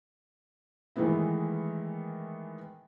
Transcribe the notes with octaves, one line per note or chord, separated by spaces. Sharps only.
D#3 E3 G#3 A3 B3 E4